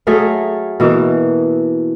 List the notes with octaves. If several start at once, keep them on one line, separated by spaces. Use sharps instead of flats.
F#3 A3 G#4 F5
B2 E3 A#3